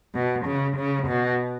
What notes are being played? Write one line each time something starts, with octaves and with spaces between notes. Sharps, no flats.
B2
C#3
C#3
B2